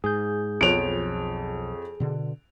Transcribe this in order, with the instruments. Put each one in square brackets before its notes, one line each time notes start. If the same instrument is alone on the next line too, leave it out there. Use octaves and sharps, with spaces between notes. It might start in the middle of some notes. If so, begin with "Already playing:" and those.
[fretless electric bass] G#2 [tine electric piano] G#4 G6
[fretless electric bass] B1 F3 B3 [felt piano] F2 C#5 F#6 [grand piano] D7 F7
[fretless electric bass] B2 D3